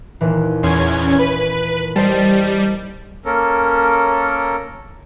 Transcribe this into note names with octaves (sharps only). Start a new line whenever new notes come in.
D#2 A#2 E3
E2 C#4 C6 G#6
B4
G3 C5 D#5 A5
A#3 C#4 A4 A#4